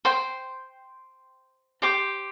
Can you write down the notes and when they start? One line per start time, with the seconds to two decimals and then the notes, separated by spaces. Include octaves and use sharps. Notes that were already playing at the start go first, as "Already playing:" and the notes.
0.05 C5 G5 C6
1.82 G4 C5 G5 D6